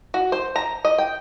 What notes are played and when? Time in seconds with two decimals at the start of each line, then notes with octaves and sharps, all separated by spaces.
0.14 F#4
0.32 C5
0.56 A#5
0.85 D#5
0.98 G5